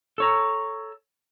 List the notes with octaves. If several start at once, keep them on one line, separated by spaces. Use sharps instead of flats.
A4 C#5 A#5